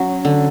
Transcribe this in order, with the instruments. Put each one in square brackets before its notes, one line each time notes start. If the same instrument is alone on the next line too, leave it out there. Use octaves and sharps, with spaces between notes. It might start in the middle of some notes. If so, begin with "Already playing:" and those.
Already playing: [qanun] F#3 [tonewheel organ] C#4
[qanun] D3